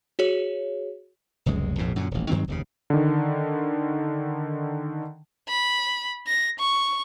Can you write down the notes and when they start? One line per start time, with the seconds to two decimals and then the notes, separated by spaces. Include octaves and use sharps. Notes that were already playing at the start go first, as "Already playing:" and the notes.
0.19 F#4 G#4 C#5
1.46 F1 C#2 F#2 G#3
1.78 A#1 F2 G#2 B2
1.96 F#2 A#2 D3
2.11 D#1 A1
2.29 G2 D#3 F#3 C4
2.48 F1 D#2 C#3
2.90 D3 D#3
5.49 B5
6.27 A#6
6.59 C#6